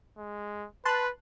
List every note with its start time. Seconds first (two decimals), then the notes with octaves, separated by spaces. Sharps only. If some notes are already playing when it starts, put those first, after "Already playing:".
0.18 G#3
0.85 B4 A5 C6 F#6